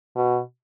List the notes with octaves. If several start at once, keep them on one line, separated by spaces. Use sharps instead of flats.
B2